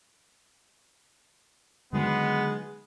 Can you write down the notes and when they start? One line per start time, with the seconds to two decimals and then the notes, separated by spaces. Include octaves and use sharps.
1.93 D3 D#3 F#3 G#3 B3